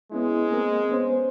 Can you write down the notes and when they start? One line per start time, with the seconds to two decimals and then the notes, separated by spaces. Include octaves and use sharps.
0.12 G#3 B3 C#4 E4
0.51 A#3 C4 A#4
0.90 B3 C#4 C5